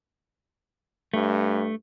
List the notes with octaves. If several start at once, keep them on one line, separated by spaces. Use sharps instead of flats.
G2 A3